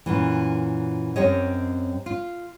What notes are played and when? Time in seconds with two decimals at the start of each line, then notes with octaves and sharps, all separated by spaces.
0.06 F#2 A#2 E3
1.16 F#2 C4 G4 C#5 D#5
2.06 F4